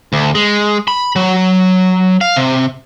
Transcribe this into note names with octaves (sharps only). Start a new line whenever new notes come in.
D2
G#3
B5
F#3
F5
C3